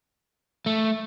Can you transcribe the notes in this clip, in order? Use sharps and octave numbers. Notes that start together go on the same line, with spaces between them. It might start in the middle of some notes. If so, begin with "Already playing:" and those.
A3